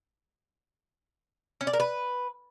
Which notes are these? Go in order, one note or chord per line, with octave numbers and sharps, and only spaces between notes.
C#4
D5
A#4
B4